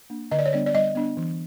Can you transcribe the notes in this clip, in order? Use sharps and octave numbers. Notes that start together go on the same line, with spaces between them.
A#3 D4
D3 D#5
D5
C#5
G3 B3 D4 D5
D5
G3 D#5
B3 D4
E3